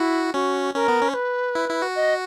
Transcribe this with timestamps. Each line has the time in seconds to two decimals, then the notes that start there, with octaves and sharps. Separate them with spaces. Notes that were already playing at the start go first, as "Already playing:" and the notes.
Already playing: E4 F#4
0.34 C#4 F#4
0.74 C#4 A#4
0.88 B3
1.01 C#4
1.09 C#5
1.14 B4
1.55 E4
1.69 E4
1.82 F#4
1.96 D#5